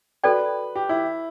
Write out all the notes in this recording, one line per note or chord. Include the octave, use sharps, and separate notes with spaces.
F#4 A4 B4 D5 G5
G4
E4